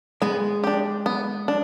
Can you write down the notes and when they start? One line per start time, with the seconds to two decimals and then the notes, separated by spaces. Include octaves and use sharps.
0.22 G#3 B3
0.64 D4 G4
1.06 B3
1.48 D4